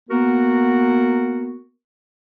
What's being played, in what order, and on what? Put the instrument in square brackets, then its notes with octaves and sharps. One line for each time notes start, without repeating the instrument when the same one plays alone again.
[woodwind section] A#3 B3 F#4 A#4